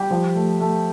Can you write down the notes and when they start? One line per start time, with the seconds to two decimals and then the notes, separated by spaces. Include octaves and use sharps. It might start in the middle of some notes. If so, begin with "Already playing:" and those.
Already playing: G3 G4
0.11 F3
0.35 A3
0.60 A3